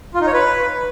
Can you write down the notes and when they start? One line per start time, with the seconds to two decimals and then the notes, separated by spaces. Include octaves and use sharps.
0.14 F4
0.20 D#4
0.27 C#5
0.33 B4